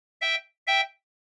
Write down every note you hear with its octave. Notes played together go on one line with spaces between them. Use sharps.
E5 G5
E5 G5